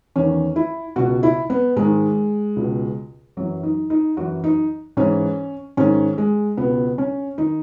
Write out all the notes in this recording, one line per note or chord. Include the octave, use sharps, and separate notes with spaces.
E2 D#3 C#4
E4
C#2 B2 F#4
E4
B3
G#2 D#3 G#3
C#2 B2
F#2 E3 F#3
D#4
D#4
F#2 E3 F#4
D#4
G#2 E3 C#4
G#2 D#3 C#4
G#3
C#2 B2 B3
C#4
D#3 D#4